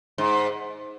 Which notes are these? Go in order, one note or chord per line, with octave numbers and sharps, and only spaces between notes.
G#2